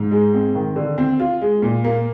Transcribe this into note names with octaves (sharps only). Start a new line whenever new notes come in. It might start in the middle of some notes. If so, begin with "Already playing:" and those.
Already playing: G#2
G#3
C4
D#3
D3
C4
F4
G#3
A#2
A#3